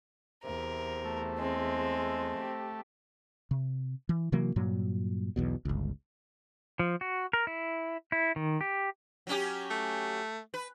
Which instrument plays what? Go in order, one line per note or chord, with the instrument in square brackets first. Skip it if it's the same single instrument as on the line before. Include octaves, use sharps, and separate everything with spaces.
[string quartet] E2 [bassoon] C3 [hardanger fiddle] A#4
[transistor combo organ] A3
[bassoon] G#3 [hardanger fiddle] C4
[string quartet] G4
[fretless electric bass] C3
E3
C3 E3 F#3 A#3
G2 A#2 F#3
B1 E2 B2
G1 C#2
[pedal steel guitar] F3
F#4
A#4
E4
E4
D#3
G4
[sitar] F#3 C#4 G4
[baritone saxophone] A3
[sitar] B4